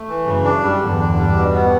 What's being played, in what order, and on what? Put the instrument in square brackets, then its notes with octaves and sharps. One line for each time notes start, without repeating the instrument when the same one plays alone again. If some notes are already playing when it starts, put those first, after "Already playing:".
Already playing: [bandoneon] A3
E3
[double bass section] F#2 [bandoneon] C#3
[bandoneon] D4
G3
[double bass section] E2 G2 [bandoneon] D3
[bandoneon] D4
G3
B2
B3